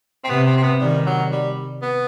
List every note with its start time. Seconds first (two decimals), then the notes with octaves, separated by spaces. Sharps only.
0.24 C4
0.29 C3 B3
0.47 C4
0.57 C4
0.63 B3
0.80 D#3 G3
1.06 F#3
1.32 G3
1.82 B3